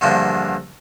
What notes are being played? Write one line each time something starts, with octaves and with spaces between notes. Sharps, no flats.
E2 G2 D3 F3 A#3